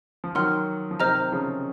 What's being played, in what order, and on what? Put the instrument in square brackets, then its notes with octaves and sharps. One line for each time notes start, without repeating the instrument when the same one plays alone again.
[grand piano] F3
[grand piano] D#3 F#3 [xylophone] F#5 C6 F6
[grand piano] F3
[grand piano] C3 D#3 [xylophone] C5 D#5 A#5 F6
[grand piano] C#3 F3